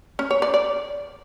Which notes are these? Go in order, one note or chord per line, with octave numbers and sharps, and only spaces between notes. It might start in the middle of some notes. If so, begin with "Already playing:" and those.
C#4
C#5
D5
D5